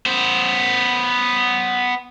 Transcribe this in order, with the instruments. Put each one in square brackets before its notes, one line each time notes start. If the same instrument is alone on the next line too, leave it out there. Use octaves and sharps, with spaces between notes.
[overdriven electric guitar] B3 C5